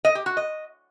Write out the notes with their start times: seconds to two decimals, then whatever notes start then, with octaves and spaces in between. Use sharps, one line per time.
0.05 D#5
0.15 G4
0.26 F#4
0.37 D#5